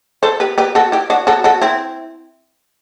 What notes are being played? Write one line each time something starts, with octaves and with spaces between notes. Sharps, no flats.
A4 C5
G4 B4
G4 B4
F#4 A4
E4 G4
D4 F#4
F#4 A4
F#4 A4
C4 E4